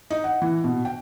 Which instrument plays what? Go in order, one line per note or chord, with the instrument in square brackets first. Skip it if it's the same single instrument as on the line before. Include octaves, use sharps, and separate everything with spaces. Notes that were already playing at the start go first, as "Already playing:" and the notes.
[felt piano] D#4
F#5
E3
B2
G5